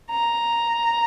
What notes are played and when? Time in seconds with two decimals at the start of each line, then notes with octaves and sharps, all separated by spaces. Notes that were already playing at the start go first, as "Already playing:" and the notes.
0.11 A#5